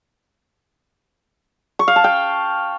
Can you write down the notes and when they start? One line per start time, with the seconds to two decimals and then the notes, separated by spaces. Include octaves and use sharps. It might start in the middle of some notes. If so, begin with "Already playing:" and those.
1.79 C#6
1.88 F5
1.96 A5
2.04 G5